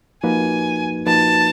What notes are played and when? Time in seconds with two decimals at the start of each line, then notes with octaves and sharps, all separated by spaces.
0.23 F3 A#3 D#4 F#4 B4 G#5
1.06 F3 A#3 D#4 F#4 B4 A5